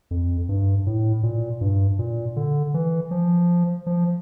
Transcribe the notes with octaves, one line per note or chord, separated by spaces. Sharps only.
F2
G2
A2
A#2
G2
A#2
D3
E3
F3
F3